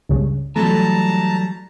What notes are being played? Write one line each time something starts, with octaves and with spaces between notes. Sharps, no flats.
C#2 G2 C#3
E3 F#3 G3 A3 A5 A#5